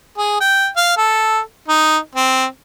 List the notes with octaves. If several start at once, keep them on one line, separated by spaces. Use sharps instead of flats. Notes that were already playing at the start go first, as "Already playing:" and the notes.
G#4
G5
F5
A4
D#4
C4